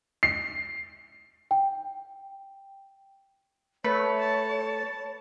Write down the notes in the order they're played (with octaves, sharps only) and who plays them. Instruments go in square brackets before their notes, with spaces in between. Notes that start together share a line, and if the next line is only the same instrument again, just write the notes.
[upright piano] C7
[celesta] G5
[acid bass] A3 [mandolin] B4 [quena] C#5
[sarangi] A5